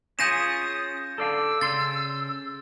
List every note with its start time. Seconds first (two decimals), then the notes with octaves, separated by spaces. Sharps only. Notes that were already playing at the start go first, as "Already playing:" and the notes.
0.19 C#4 F4 G#4 D#6 G6 A#6 E7
1.18 A4 D5 F5 E6
1.61 C#3 C6 A6